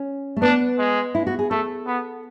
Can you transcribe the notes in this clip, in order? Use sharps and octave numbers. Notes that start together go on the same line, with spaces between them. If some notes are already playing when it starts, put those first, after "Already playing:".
Already playing: C#4
A3
B3 D4
G#3
E4
F#4
G#4
A3 A4
B3